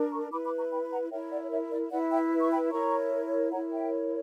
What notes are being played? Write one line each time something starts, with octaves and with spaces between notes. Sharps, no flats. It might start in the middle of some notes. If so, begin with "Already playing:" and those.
Already playing: D4 A#4
A#5 C#6
E4 B4 B5 D6
B5 D6
A#5 C#6
G5 B5
F#5 A#5
E4 A#4 C#5 E5 G5
D5 F#5
C#5 E5
D5
E4 B4 D5 F#5
E5 G5
C#6
G5 B5
E4 A#4 C#5 A#5 C#6
E4 A#4 C#5 F#5 A#5
E5 G5